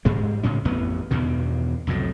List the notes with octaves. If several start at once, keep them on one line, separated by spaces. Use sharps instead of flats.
G#2 G3 G#3
A2 C#3 C#4
A1 F2 B3
E2 G2 B2 D#3
C2 F2 A2 F#3